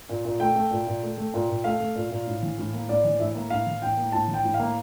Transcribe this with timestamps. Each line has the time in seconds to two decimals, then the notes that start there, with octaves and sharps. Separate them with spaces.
0.09 A#2
0.25 A#2
0.40 A3 G5
0.56 A3
0.71 A#2
0.87 A#2
1.03 A3
1.18 A3
1.34 A#2
1.49 A#2
1.64 A3 F5
1.80 A3
1.96 A#2
2.11 A#2
2.26 A2
2.42 E3
2.58 A2
2.73 A#3
2.88 A2 D5
3.04 E3
3.19 A2 E5
3.35 A#3
3.50 A2 F5
3.67 E3
3.82 A2 G5
3.97 A#3
4.12 A2 A5
4.28 E3
4.34 G5
4.44 A2
4.54 F5
4.59 A#3